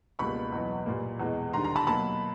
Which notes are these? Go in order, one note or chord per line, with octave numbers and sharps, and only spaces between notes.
C#2 B2 G3 A#3 B5 C#6
E2 B2 F#3
A#2 G3 A#3
E2 B2 G#3
D#2 D3 G3 A#5 C6
A#5 C6
A5 B5
B2 F#3 A#3 A5 B5